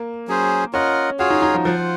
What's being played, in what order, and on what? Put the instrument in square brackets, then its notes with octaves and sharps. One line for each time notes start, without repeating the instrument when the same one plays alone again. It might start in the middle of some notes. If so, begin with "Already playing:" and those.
Already playing: [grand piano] A#3
[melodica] F#3 C#4 G#4 C5
[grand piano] C#4 [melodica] F4 A#4 D#5 F#5
[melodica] F4 G#4 C#5 F5 [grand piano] F#4
[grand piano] D#4
D#4
F3
[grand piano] F3 [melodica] F4 C5 F#5